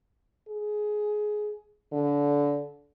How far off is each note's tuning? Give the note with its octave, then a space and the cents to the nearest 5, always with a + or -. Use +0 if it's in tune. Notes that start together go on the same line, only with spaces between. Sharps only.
G#4 +15
D3 -25